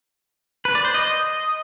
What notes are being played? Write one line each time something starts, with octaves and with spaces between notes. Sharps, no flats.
B4
D5
C5
D#5